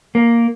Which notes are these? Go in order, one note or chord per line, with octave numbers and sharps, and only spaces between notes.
A#3